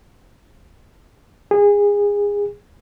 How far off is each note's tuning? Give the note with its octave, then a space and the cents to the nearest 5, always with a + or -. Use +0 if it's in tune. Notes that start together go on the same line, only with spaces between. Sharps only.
G#4 -25